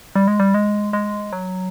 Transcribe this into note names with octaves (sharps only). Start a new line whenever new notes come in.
G3
G#3
G3
G#3
G#3
F#3